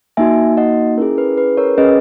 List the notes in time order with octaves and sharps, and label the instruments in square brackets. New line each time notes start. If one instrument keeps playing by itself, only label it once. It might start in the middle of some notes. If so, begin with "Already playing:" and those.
[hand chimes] A#3 D#4 F#4 E5 G#5
D#5 F#5
C#4 E4 G#4 A#4
B4
B4
A#4 C#5
C#4 G#4 B4 D#5